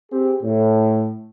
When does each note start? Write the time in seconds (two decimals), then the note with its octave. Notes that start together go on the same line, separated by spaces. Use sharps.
0.11 C4 G4 G#4
0.43 A2